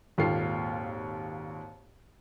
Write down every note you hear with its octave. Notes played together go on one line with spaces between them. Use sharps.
G#1 D#2 A#2 F4 A4 C7